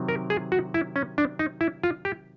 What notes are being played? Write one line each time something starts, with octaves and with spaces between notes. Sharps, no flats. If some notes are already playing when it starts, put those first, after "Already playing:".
Already playing: C3 D#3 F#3 C4
A#4
G#4
F#4
E4
C#4
D4
D#4
E4
F4
G4